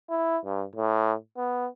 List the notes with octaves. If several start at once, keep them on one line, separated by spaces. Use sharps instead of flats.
E4
G2
A2
B3